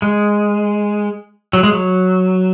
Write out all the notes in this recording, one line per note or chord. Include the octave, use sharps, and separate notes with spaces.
G#3
F#3
G#3
F#3